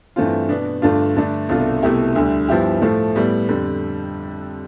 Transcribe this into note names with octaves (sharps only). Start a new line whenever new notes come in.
G2 E3 A3 C4 F4
B2 B3 D4
G2 D3 A3 D4 F4
G2 D3 A3 D4
C2 B2 A3 D4 F4
C2 B2 A3 E4 G4
D2 D3 G3
G2 F3 B3 E4 G4
A2 F3 A3
A2 G3 B3
F2 D3 G3